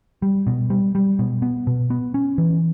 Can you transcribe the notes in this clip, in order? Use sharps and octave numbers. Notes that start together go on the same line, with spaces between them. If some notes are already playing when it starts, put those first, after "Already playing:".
G3
B2
G3
G3
B2
B3
B2
B3
C#4
E3